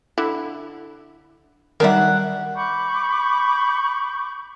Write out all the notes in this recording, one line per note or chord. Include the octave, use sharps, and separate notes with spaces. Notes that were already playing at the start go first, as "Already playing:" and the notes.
D3 E4
D#3 F#3 G3 D4 A#4 E5 F#5
B5 C#6 D6 G6